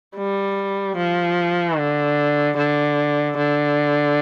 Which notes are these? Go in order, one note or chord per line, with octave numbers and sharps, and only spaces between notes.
G3
F3
D3
D3
D3